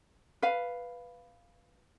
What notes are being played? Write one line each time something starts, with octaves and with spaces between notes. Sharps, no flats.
B4 F5